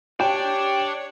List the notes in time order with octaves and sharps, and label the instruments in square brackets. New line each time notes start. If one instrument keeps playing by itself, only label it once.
[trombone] G4 [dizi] C#5 [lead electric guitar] D5 A5 [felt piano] G5